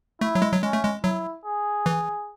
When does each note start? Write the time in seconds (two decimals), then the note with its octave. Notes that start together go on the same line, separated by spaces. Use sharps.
0.21 A3 E4
0.35 F#3
0.42 G#3
0.53 F#3
0.62 G#3 C#4
0.73 A3
0.83 G#3
1.04 F#3 E4
1.45 G#4
1.86 E3